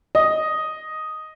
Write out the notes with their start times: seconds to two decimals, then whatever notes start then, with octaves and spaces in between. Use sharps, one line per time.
0.15 D#5